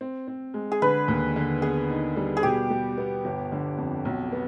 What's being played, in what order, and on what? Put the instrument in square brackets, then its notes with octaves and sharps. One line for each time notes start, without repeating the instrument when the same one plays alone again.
[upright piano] C4
C4
G#3
[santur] G#4
[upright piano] D3 [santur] B4
[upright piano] D#2
D3
[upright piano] B3 [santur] G#4
[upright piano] D#4
G3
[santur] G#4
[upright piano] B2 [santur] G4
[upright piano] G3
B3
G1
D3
F2
B1
B3